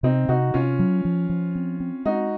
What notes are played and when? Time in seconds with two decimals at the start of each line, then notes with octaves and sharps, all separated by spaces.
0.03 C3 C4 D#4
0.29 C3 D#4 F#4
0.54 C3 C#4 F4
0.79 F#3
1.05 F3
1.29 F3
1.55 C4
1.80 C4
2.05 G#3 D#4 F#4